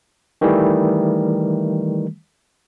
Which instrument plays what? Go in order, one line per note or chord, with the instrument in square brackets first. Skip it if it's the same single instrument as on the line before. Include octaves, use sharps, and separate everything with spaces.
[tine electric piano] D#3 E3 G3 A3